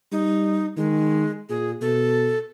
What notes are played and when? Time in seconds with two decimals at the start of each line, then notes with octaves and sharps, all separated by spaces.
0.12 G3 D#4
0.77 D#3 G#3
1.49 A#2 G#4
1.82 B2 A4